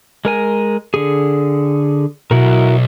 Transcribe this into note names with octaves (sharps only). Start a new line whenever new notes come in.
G#3 A#4 G#5
D3 G#4
B1 E4 F#4 A#4